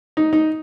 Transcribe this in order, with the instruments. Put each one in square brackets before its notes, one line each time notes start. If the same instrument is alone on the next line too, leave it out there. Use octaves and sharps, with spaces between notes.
[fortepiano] D#4
D#4